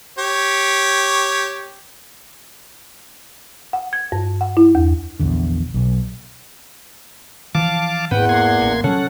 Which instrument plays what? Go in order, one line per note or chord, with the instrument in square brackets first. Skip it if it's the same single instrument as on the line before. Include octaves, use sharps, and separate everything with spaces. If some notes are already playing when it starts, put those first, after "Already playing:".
[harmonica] G4 C#5
[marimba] F#5
G#6
G2
F#5
E4
E2
[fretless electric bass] A#1 E2 D3
B1
[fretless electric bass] E3 F3 [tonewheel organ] F5 A5 D6
[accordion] E2 F#5 [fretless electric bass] G#2 C4 [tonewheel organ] B4 G5
[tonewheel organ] A#3 C6 G#6
[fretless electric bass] A1
[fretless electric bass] C#3 F#3 [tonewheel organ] C#4 A4 F#5